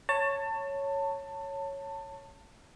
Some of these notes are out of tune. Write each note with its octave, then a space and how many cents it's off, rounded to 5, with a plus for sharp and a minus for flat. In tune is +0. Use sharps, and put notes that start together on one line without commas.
C#5 +0 A5 +25